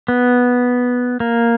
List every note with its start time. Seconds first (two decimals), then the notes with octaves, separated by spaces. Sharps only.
0.08 B3
1.20 A#3